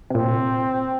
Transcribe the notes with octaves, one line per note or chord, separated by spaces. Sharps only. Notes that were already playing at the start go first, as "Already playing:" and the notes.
C3
A#2 C4